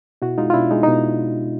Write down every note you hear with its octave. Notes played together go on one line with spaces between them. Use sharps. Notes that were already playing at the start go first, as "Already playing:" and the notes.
B2 E4 F#4
G#3 D#4 F4
F4
B2 D4 E4
G#3 D#4
D#4
B2